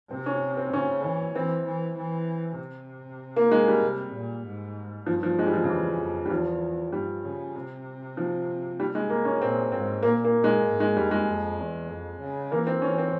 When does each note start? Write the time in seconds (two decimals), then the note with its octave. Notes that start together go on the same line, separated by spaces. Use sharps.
0.11 C3 C4
0.26 C#4
0.57 C4
0.73 C#3 C#4
1.04 E3
1.35 E3 C4
1.66 E3
1.97 E3
2.59 C3
3.36 A#3
3.51 G#3
3.68 G3
3.82 C3
4.14 A#2
4.46 G#2
5.06 G2 F3
5.23 F3
5.39 G#3
5.46 G3
5.54 F3
5.64 C#3
5.68 E2 E3
6.00 F2
6.26 G3
6.30 E2 F3
6.92 G2 G3
7.25 C#3
7.56 C3
8.17 F3
8.80 G3
8.95 G#3
9.10 A#3
9.25 C#4
9.41 A#2 C4
9.72 G#2 C4
10.03 A#2 A#3
10.24 A#3
10.44 G#3
10.65 G#2
10.80 G#3
10.96 F2 G3
11.11 G#3
11.27 F2
11.59 E2
11.89 F2
12.20 C#3
12.51 E3 A#3
12.67 C4
12.82 E3 C#4
12.98 C4